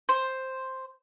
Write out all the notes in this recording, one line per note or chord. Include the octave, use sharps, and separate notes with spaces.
C5